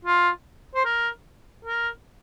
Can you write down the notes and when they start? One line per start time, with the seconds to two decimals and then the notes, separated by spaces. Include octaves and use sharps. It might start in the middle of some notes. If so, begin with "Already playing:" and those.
0.05 F4
0.75 C5
0.85 A#4
1.65 A#4